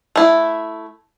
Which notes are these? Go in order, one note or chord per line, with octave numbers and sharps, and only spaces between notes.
A3 E4